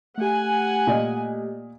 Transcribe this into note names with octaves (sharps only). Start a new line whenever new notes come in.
A3 G4 F#5 G#5
A#2 D5 D#5